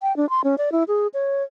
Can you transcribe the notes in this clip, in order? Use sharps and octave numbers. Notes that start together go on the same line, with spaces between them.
G5
D4
C6
C#4
D5
E4
G#4
C#5